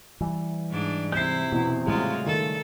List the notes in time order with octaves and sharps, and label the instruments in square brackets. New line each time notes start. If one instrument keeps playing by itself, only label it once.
[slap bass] E3 G3
[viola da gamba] G#2 D4
[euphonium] C3 [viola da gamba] E4 [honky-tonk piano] G6 C7
[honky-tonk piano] E2 [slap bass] B2
[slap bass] A2 C#3 G3 [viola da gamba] G#3 F4 F#4
[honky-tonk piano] D#3 [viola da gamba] A4